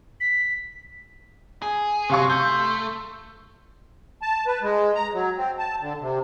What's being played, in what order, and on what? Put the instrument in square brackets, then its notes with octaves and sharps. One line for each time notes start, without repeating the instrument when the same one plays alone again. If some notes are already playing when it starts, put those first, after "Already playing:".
[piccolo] B6
[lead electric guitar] G#4
[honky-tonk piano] C3 F5 C#6 [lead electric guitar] F#3 [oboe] C6
[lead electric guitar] A3 [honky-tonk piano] G6
[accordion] A5
B4
G#3
A#5
F#3
C4
A5
D3
C3